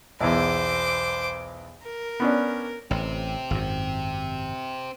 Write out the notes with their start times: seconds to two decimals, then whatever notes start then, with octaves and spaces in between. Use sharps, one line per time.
0.21 B1 E2 C5 D6
1.83 A#4
2.20 B3 C#4 D4
2.91 A1 C4 G4
3.51 G#1 F#2